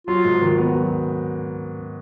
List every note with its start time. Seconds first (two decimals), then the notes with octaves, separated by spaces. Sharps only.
0.07 F#3 F4
0.25 G#2
0.42 D#3
0.58 B3
0.75 F#3